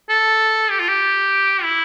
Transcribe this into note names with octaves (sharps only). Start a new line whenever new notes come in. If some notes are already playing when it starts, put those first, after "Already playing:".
A4
G4
F4
G4
E4